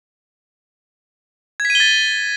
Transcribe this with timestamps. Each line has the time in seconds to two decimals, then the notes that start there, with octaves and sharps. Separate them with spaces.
1.60 G#6
1.65 B6
1.70 D#7
1.75 G7
1.80 A6